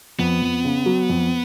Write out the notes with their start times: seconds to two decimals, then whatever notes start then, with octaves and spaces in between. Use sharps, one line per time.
0.19 F2 B3
0.42 F2
0.64 C#3
0.86 F#3
1.09 F2